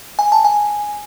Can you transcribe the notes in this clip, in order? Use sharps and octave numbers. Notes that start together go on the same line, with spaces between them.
G#5
A5
G#5